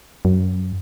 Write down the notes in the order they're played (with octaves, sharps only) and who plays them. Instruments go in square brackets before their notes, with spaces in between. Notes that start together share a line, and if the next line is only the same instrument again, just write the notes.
[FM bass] F#2